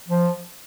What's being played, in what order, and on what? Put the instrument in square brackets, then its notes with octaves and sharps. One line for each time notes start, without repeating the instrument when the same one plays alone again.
[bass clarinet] F3